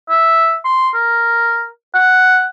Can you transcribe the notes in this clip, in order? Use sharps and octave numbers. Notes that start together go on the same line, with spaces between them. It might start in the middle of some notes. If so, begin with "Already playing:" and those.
E5
C6
A#4
F#5